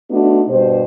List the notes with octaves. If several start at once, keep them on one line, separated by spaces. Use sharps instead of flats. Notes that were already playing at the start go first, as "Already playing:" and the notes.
A3 B3 D4 D#4 F#4
G2 B2 G4 C5